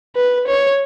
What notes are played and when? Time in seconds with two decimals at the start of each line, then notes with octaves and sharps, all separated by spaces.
0.16 B4
0.47 C#5